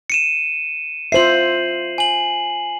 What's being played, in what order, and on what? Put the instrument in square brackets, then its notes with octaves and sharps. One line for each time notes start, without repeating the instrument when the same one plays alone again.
[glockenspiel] C#7 D#7 E7
[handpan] F4 C5 E5 [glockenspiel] C7 F#7
[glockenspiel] G#5 F#7